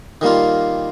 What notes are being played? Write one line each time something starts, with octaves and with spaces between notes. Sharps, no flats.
D#3 G3 A#3 F4